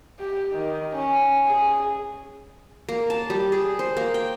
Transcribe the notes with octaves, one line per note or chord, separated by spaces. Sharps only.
G4
D#3
C#4
G#4
A#3
A5
G3
G#4
C5
A#3
G5